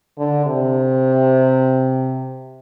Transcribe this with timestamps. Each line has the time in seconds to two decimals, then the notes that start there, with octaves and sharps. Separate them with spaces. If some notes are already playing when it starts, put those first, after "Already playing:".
0.18 D3
0.46 C3